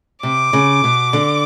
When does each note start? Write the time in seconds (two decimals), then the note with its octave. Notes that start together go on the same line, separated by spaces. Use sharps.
0.23 C3 D6
0.53 C#3
0.84 B2
1.13 D3